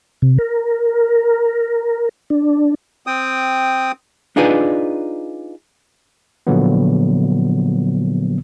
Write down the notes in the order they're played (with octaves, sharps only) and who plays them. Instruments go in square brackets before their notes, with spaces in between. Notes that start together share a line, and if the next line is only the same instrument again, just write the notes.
[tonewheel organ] C3
A#4
D4
[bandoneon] C4 G5 D#6
[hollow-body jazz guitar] D4 D#4 F4 G#4 B4 D5
[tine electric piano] A#2 D3 F3 F#3 A#3 B3